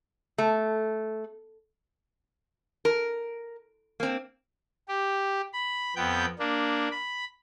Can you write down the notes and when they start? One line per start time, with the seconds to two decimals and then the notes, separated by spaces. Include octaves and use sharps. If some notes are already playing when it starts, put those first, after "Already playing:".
0.38 A3
2.85 A#4
4.00 A#3 C4
4.88 G4
5.53 B5
5.96 F2 B3 G5 G6
6.39 A#3 D4
6.91 B5